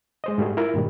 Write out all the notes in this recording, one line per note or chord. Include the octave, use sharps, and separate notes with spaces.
G#3 C5 D#5
G#2 G3 A3 F#4 G#4
E4 F4 A#4
G2 A#2 D#3 G3